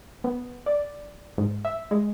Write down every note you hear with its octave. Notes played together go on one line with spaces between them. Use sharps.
B3
D5
G#2
E5
G#3